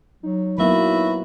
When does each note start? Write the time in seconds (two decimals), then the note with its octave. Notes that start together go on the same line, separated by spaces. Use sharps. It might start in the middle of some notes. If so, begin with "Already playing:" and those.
0.23 F#3 D#4
0.58 F#3 A#3 B3 E4 F#4 B4 E5